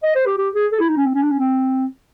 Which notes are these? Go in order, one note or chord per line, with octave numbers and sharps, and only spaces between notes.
D#5
C5
G4
G4
G#4
A4
E4
D#4
C#4
C4
C#4
D4
C#4
C4